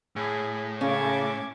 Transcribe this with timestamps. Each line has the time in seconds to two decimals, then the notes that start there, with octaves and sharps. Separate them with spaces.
0.16 A2 G#4
0.81 C#3 C#4 A5 D6 G#6